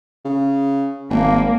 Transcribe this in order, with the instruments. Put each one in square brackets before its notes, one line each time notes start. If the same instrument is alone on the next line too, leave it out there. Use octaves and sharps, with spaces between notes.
[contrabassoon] C#3
[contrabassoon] G#1 [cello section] A#3